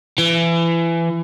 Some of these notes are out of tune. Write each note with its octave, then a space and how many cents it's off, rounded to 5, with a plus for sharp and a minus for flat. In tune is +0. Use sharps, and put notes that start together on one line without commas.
E3 +25